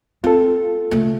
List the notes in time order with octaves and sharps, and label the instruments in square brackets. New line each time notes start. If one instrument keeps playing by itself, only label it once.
[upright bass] C4 [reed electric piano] F4 A4
[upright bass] C#3 A3